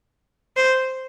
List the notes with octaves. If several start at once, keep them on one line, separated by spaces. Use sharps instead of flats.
C5